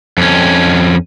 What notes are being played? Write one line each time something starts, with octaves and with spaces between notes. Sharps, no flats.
F2 C#4